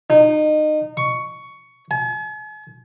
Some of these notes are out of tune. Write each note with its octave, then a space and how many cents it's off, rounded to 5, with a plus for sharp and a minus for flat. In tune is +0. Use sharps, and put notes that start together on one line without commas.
D#4 -25
C#6 +10
G#5 +45